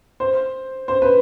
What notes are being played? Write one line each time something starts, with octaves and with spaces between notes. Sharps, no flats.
C5
C5
B4